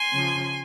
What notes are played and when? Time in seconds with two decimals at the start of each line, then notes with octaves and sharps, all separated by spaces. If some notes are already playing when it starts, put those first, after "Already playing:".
Already playing: G#5 C6
0.12 C#3 F3